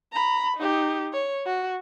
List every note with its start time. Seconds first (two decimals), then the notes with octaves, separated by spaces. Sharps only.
0.13 A#5 B5
0.57 D#4 G4
1.13 C#5
1.46 F#4